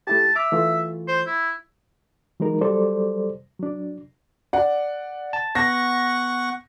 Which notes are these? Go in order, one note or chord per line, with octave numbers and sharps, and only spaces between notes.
A3 E4 G4 A5
E5 D6 F6
E3 A3 F4
C5
E4
E3 F#3 G#3 D#4 A#4
F#3 G3 A4 C5 D5
F#3 D4
D5 F#5
A5
B3 F#5 C#6 A#6